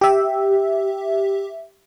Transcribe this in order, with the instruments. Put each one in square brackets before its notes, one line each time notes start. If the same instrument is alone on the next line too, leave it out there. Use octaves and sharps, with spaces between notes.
[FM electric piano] G4 E5